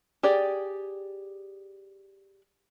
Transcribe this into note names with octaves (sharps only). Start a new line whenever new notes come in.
G4 G#4 D5